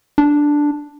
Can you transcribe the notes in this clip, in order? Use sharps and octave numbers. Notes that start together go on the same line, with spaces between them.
D4